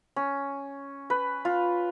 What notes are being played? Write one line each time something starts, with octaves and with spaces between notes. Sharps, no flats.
C#4
B4
F4